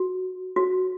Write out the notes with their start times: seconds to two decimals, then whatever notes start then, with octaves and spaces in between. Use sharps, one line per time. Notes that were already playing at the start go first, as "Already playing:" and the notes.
Already playing: F#4
0.56 F#4